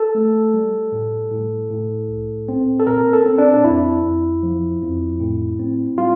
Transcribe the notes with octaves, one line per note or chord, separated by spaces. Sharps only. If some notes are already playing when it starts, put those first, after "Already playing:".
Already playing: A4
A3
G3
A2
A2
A2
C2
C4
A4
A#2 A#4
A4
C4
D4
D4
F2 E4
F2
F3
F2
A2
C4
G3 F4